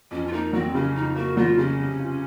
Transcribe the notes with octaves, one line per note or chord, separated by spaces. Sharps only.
F2 C#4
F4
A#3 D#4
F#3 C4
C#3 C#4
F2 D#4
A#3 F#4
F#3 F4
C#3 C#4
C3
F4